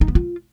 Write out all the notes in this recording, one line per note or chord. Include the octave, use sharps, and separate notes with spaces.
D#4
B3
F4